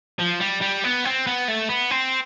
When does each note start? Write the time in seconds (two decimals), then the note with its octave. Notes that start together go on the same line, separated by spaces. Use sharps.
0.19 F3
0.41 G3
0.62 G3
0.84 B3
1.05 C4
1.27 B3
1.48 A3
1.69 B3
1.91 C4